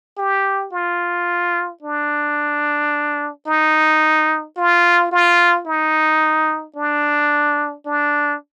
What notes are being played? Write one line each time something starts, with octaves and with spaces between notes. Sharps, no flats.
G4
F4
D4
D#4
F4
F4
D#4
D4
D4